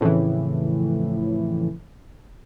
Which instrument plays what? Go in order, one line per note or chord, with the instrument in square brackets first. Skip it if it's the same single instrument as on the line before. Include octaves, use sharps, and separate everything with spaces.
[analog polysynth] F2 A2 C#3 E3